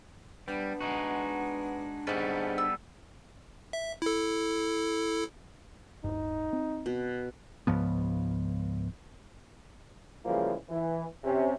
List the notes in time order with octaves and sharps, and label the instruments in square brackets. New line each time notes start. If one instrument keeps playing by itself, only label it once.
[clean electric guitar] G3 [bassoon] B3 [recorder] D4
[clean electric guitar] G#3 D#4 F#4
[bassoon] G#2 [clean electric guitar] G3 B3 A4 [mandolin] C#4 F#6
[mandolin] E6
[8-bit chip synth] E5
E4 A4
[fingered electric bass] D1 G#1 G2 [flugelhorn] D#4
[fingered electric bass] C4
[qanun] B2
[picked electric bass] C#2 G#2 F3 B3
[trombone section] C#3 E3 F3 G3 G#3 A#3
E3
C3 C#4